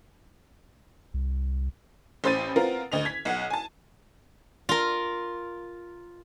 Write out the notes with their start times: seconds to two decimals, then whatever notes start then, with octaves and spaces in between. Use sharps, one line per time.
1.14 C2
2.24 A1 C5 B5 A6 D#7
2.56 B3 C4 F4 A#4
2.92 D2 D#5 F7
3.05 G#6 B6
3.25 B1 F#5
3.50 G#5 A5
4.69 F4 A#4